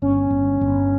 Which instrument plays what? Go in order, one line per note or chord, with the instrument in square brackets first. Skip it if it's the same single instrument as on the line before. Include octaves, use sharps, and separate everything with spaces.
[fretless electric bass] G1 [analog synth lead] C#4
[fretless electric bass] G1
G1